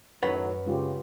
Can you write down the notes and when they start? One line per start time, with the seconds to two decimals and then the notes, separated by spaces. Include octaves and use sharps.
0.23 F#2 A2 D#3 F#3 B4 C#5 F#5
0.66 C#3 G#3 F4 G4